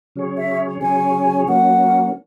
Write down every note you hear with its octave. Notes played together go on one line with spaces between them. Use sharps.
C#3 F#3 C#4 G#4 C#5
E5
C#3 F#3 C#4 G#4 C#5 G#5
F#3 A#3 C#4 F#5